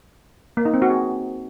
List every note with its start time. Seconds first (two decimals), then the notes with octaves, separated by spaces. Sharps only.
0.57 A#3
0.65 D#4
0.74 C4
0.82 F#4
0.90 G#4